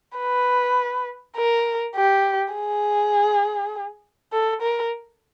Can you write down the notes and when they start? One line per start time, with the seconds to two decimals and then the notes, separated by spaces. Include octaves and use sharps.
0.18 B4
1.37 A#4
1.96 G4
2.55 G#4
4.33 A4
4.62 A#4